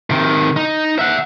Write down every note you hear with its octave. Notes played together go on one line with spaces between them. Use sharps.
C3 D#3
D#4
E5 F#5